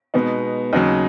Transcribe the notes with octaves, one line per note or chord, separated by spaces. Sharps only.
B2 G#3 B3 D#4
D#2 C#3 F#3 D#4